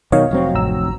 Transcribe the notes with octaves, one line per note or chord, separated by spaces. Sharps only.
B2 D#3 F#3 C#5 D#5 F5
F1 F#3 C4
A1 A#5 E6